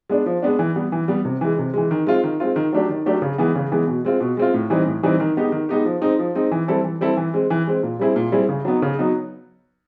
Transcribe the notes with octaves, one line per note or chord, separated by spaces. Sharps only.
G#3 B3 D4
F3
G#3 B3 D4
E3
G3 B3
E3
G3 B3
C3
E3 G#3
C3
E3 G#3
D#3
G#3 C4 F4
D#3
G#3 C4 F4
D#3
F#3 A3 D4 G4
D#3
F#3 A3 D4 G4
C#3
E3 G#3 B3
C#3
E3 G#3 B3
B2
G#3 C4 F4
B2
G#3 C4 F4
A2
E3 G3 C4 D#4
A2
E3 G3 C4 D#4
D#3
G#3 B3 D#4 G4
D#3
G#3 B3 D#4 G4
F3
G#3 C4 D#4
F3
G#3 C4 D#4
E3
G3 C4 E4 A4
E3
G3 C4 E4 A4
E3
G#3 C4
E3
G#3 C4
A#2
G3 C4 E4 G#4
A#2
G3 C4 E4 G#4
C#3
F#3 B3 D#4
C#3
F#3 B3 D#4